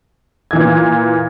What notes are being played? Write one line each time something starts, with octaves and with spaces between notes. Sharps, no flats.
A#2 E3 G#6